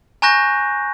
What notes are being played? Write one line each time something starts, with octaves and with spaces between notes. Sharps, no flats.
G#5 A#5 C#6 F#6 G6 A#6